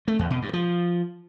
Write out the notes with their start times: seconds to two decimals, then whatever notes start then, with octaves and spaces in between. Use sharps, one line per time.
0.08 A3
0.19 E2
0.30 B2
0.42 G2
0.53 F3